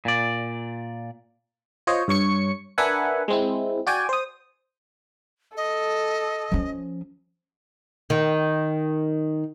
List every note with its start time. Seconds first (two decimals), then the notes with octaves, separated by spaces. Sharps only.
0.05 A#2 D5
1.87 F4 C5 C#5 D#5
2.08 G2 C#5 C#6 C#7
2.78 D4 A#4 B4 E5 F#5 G#5
3.28 G#3 C4 E4
3.87 F#4 D5 G5 G#5
4.09 C5 D#6
5.57 A4 D#5
6.52 F3 C#4
8.10 D#3